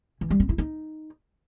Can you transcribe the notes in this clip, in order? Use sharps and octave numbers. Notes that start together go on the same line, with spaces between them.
E3
G3
C4
E4
D#4